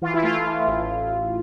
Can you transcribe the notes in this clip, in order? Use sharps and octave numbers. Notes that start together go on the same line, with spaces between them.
E3 F4
E4
A3 F4
E3
A1